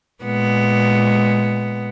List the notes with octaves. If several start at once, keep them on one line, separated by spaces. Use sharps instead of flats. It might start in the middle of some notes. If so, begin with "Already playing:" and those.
A#2 G#3 B3